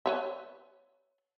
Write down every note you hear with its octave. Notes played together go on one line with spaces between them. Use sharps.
B4 C#5 E5